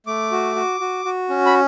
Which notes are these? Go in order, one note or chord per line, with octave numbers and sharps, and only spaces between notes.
A3 D6
F#4
F#4
F#4
F#4
C#4
B5